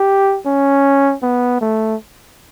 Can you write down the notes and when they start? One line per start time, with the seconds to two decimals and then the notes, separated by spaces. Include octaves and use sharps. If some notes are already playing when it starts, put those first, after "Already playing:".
Already playing: G4
0.46 C#4
1.23 B3
1.61 A3